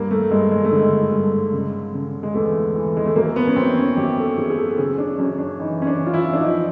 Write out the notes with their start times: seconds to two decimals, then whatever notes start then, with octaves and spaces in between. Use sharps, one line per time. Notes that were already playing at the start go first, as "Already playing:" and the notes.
Already playing: G2 A#3
0.11 A3
0.31 G2 G#3
0.51 G#3
0.65 A3
0.72 D3
0.77 G#3
1.12 G2
1.53 C#3
1.94 C#3
2.23 G#3
2.35 E2 A3
2.75 E3
2.97 G#3
3.06 A3
3.16 F#2 A#3
3.36 B3
3.47 C#4
3.56 F#2 C4
3.77 C#4
3.96 F#2 G4
4.18 A4
4.38 F#2 G#4
4.50 G#4
4.58 A4
4.74 A4
4.78 C#3 G#4
4.90 C#4
4.98 D4
5.18 F#2 C#4
5.39 D4
5.59 E3 D#4
5.82 C#4
5.87 D4
6.00 E3
6.06 F4
6.14 E4
6.33 D4
6.40 F3 D#4